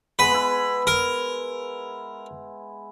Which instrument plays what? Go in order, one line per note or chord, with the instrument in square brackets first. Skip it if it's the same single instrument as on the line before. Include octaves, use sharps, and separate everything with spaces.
[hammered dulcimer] G#3 B3 [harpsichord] B4
[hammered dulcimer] B3 E4
[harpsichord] A#4